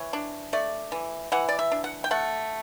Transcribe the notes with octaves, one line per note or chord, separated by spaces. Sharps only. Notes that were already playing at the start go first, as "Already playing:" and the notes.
Already playing: E3 C#5
D4
A3 D5
E3
E3 F#5
D5
E5
D4
F#5
G5
A3 F#5